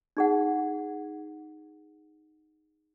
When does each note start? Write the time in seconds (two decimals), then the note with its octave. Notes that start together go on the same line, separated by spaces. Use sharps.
0.17 D#4 G#4 F#5